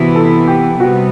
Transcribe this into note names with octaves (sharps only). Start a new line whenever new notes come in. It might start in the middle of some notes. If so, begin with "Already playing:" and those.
Already playing: C3 E3 B3 E4 F#4
A4
G4
C3 G3 B3 F#4